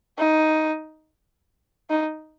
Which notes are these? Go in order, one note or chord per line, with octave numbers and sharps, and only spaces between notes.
D#4
D#4